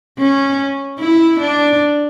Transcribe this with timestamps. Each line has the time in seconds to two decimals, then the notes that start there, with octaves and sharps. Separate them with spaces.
0.18 C#4
0.99 E4
1.40 D4